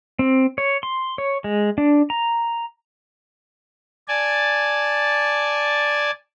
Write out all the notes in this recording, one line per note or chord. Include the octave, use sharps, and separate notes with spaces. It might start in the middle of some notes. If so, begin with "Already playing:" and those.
C4
C#5
C6
C#5
G#3
D4
A#5
D5 G#5 A5